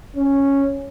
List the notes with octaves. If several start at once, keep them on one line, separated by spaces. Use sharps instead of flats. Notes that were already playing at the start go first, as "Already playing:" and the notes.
C#4